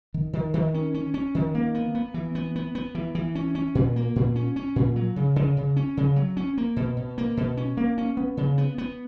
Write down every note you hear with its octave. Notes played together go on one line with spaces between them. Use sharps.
D#3
D#3
D#3
C#4
C#4
C#4
D#3
A#3
B3
B3
E3
B3
B3
B3
E3
E3
C#4
C#4
A#2
A#3
A#2
C#4
C#4
A#2
F#3
C#3
C#3
C#3
C#4
C#3
F#3
C#4
A#3
B2
B2
A#3
B2
C#4
A#3
C#4
B3
C#3
B3
B3